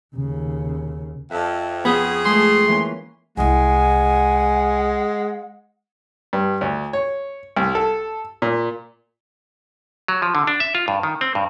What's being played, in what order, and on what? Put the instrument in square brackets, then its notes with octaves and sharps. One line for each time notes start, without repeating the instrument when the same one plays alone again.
[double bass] D#2 C#3
[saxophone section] F2 [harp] E5 A5
[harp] F2 [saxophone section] C#3 G#4 [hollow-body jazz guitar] B3
[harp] G#3 A3 [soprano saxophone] C6
[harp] E3 A#3 C#4
[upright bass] C2 E4 [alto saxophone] G#3 [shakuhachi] F#5 [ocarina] G#5
[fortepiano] G2
D2
C#5
C2
A4
A#2
[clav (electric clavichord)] F#3
F3
D3
D4
E5
F4
G2
D#3
C4
G2